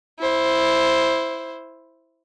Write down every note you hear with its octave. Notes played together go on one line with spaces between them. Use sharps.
E4 C5